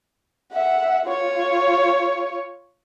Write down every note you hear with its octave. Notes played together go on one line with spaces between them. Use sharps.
E5 F#5
F4 C#5